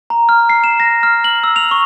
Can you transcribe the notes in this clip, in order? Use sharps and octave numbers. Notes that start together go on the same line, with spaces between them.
A#5
F6
C7
E7
A#6
F6
F#7
E6
F7
C#6